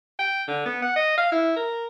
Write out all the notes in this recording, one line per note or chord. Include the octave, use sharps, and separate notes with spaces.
G5
D3
B3
F#5
D#5
F5
E4
A#4